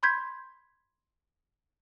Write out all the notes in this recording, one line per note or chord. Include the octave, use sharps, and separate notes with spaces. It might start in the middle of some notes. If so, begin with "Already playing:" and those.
B5 C6 G6 G#6 B6